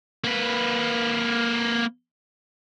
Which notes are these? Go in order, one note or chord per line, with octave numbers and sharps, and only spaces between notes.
A#3 B4